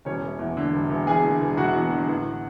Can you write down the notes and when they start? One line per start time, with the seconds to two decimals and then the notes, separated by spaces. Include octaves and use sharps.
0.05 E1 C#4 C#5
0.23 E1
0.39 E2
0.57 D3
0.73 E1
0.90 E1
1.06 E2 G#4 G#5
1.23 D3
1.41 E1
1.57 E1 F#4 F#5
1.75 E2
1.92 D3
2.09 A1